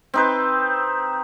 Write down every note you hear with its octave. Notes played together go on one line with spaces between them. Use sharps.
C4 D#4 B4